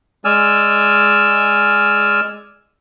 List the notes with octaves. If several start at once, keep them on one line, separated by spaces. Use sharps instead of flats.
G#3 D5 G#5 E6 F6